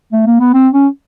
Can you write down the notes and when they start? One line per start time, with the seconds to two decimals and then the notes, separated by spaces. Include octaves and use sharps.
0.13 A3
0.26 A#3
0.40 B3
0.54 C4
0.73 C#4